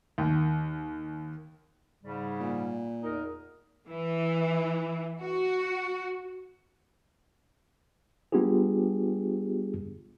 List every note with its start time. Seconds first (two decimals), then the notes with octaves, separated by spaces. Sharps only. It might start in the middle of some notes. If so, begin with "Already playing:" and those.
0.18 D#2
2.03 G#2 C#3 G3
2.40 A#2
3.03 E2 D#4 A#4
3.88 E3
5.21 F#4
8.32 G3 B3 D4 F4 G4 G#4